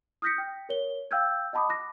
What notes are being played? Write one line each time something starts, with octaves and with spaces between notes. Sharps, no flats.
D#6 F6 G6 A#6 B6 C#7
G5
A#4 C#5 G7
F5 G5 E6 F6 G6 G#6
D#5 F#5 A5 B5 D6 D#6
D6 F#6 A#6